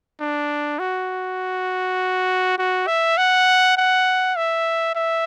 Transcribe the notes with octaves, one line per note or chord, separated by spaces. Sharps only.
D4
F#4
F#4
E5
F#5
F#5
E5
E5